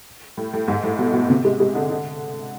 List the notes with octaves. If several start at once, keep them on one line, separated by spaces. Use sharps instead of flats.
A2
A2
G#2
A2
B2
B2
C3
G#3
G#3
D3
D3